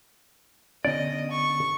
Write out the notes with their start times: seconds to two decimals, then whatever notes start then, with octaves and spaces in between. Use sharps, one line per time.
0.85 D3 B3 C#4 D5 D#5
1.31 C#6